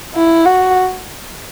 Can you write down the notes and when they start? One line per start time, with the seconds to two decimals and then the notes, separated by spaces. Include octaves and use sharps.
0.14 E4
0.46 F#4